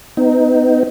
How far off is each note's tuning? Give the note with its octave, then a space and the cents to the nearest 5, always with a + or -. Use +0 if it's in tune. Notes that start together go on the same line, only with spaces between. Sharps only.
B3 +35 D#4 +0